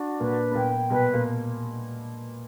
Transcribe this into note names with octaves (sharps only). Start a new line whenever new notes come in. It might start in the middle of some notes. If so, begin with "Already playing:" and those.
Already playing: D4 F#4
A#2 A#3 B4
B3
A#2 A#3 G5
B2 B3 B4
A#2 A#3